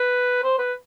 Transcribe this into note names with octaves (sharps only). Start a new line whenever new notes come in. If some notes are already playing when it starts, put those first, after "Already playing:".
Already playing: B4
C5
B4